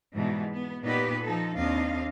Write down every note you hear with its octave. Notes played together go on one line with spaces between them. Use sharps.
G#2 B2 E3 G3
B3
A#2 B3 D#4 G4 B4
F3 D#4 A4
D#2 C4 D4 D#5 F5